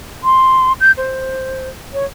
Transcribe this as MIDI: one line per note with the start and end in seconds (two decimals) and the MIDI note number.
0.24 0.73 84
0.80 0.92 91
0.97 1.69 72
1.93 2.05 73